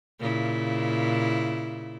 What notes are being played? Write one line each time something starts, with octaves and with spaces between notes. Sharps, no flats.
A#2 C#3 E4